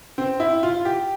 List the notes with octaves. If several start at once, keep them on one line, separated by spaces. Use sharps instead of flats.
C4
E4
F4
G4